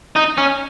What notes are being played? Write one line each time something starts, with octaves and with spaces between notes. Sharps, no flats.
D#4
C#4